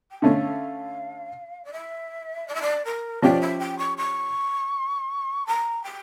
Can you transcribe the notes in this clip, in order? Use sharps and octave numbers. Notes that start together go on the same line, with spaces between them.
G5
D3 A3 C#4 F5
D5
E5
D5
E5
D5
A#4
F3 C#4 G4 D5
E5
G5
C#6
C#6
A#5
G5